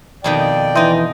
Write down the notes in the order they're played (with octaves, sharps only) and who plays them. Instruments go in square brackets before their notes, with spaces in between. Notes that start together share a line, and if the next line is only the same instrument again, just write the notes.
[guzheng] F2 B2 D#3 [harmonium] D5 G5
[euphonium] E3 [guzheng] D#4 D#5 [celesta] E5 C6 G6